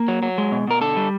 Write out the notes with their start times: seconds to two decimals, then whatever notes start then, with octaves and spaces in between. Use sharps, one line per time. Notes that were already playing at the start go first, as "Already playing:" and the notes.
Already playing: A#3
0.08 F#3
0.23 F#3
0.38 G#3
0.52 B2
0.67 B2 A#4
0.81 D3 A4
0.96 G3